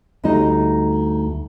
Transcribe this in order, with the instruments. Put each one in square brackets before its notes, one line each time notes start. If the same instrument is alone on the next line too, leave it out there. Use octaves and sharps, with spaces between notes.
[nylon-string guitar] D2 G3 D#4 C5 D#5